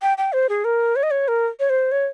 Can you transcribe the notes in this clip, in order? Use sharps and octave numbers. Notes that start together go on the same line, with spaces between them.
G5
G5
C5
G#4
A#4
C#5
D#5
C#5
A#4
C#5
C5
C#5